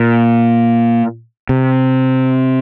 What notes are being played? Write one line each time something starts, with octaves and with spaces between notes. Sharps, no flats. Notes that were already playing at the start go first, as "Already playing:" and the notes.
Already playing: A#2
C3